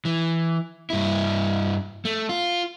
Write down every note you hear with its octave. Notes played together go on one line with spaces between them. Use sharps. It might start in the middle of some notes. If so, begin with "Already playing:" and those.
E3
G2 E4
A3
F4